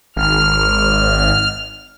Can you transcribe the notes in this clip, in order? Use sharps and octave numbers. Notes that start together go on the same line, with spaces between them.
G#1 F6